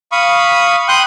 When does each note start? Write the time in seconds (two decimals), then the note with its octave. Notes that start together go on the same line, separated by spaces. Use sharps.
0.12 F5 B5 C#6 D#6
0.88 G5 C6 D#6 F#6